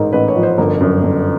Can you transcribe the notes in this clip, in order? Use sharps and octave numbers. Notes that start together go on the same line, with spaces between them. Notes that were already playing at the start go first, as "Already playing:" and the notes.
Already playing: A1 G#2 A#4
A1 B4
C#5
F3
C5
G1 A#4
F#2
G1